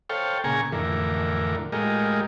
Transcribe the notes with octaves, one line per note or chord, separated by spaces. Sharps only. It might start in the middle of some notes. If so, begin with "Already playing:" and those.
A4 C5 C#5 F5 G5
A#2 C#3 G#4 G#5 A#5 C#6
F2 A2 D3 E3 A#4
A2 G#3 F4 G4 A#4 D#5